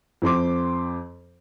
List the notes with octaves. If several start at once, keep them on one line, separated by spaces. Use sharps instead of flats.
F2 C4 C6 D6